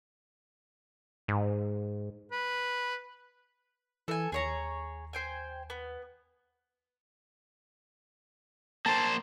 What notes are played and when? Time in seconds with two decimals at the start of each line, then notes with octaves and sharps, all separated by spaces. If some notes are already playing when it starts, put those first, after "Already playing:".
1.28 G#2
2.32 B4
4.08 E3 A4 G#5
4.32 D#2 G#4 C#5 A#5
5.13 C5 G5 G#5
5.70 B3
8.86 A#3 C5 A5